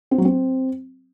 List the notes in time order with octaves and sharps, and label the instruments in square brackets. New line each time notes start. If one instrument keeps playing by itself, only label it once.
[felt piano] C4
F#3
C4